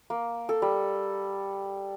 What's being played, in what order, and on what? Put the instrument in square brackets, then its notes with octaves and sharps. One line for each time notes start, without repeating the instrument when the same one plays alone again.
[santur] A#3
A4
G3